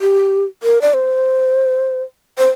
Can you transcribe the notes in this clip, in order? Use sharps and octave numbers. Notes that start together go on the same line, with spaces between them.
G4
A#4
D5
C5
C5